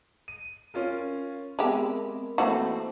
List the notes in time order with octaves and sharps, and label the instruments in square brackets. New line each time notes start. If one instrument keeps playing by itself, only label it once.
[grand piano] D#7
C#4 F4 A#4
[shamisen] G#3 G4 [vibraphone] B3 C4 A#4 [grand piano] E5
[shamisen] E3 F#4 [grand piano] A3 C4 [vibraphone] A#3